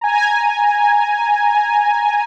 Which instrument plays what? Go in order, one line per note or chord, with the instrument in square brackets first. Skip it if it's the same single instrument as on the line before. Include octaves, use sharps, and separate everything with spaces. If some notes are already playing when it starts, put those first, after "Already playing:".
[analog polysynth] G#5 A#5